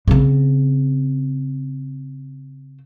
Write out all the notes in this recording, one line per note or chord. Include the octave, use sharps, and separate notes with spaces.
C#3 C4